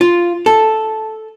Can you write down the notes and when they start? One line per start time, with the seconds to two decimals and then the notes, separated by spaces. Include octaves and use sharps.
0.01 F4
0.46 A4